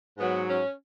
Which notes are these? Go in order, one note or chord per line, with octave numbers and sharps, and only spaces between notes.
G#2 F#3 B3
C#4